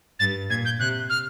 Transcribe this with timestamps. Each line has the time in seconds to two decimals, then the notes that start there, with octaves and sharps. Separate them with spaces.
0.19 G2 A6
0.50 A#2 G#6
0.65 G6
0.79 C3 F#6
1.10 F6